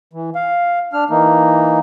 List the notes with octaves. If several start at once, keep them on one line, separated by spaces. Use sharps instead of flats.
E3
F5
D4 F6
E3 A#3 D#4